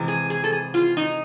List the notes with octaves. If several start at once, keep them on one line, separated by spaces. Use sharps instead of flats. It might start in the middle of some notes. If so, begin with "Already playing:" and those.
Already playing: C3 E3 G#3
G#4
G#4
A4
G#4
F4
D#4